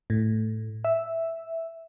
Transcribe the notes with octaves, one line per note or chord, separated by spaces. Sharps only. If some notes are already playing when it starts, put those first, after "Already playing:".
A2
E5